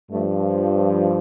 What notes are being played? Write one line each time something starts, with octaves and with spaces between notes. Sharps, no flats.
G2 F3 A3